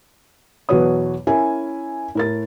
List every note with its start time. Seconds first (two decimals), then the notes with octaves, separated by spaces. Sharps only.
0.69 E2 B2 F#3 B4 C#5 D#6
1.27 C#4 E4 A#4 G#5
2.15 A2 A#4 A6